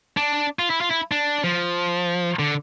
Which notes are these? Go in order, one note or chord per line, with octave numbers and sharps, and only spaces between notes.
D4
F4
E4
F4
E4
D4
F3
D3